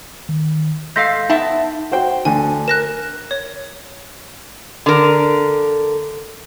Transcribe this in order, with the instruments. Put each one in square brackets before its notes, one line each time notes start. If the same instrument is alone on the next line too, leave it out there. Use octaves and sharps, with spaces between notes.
[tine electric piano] D#3
[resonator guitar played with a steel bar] G#3 A4 F5 [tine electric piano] G6 A#6 B6
[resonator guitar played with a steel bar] B3 E5 A5 [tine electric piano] D#4
[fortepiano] F#4 C5 G5
[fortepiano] D2 D3 [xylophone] G#5
[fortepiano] A#4 [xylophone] F#6 A#6 E7
[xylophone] C#5
[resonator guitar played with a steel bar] D3 A#4